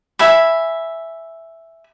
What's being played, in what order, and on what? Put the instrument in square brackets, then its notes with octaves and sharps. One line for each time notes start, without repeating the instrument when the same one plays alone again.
[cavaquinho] E5 G#5 B5